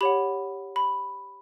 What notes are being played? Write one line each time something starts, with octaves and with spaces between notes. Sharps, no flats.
G4 C#5 F#5 B5
B5